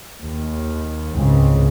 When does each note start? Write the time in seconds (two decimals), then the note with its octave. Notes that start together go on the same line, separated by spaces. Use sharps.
0.21 D#2
1.15 C#2 G#2 C#3 C4